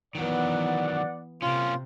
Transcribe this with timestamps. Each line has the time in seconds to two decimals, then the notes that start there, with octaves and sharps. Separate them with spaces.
0.15 D#3 E3 F#3 B3 D5 F#5
1.42 C3 A#3 C#4 F4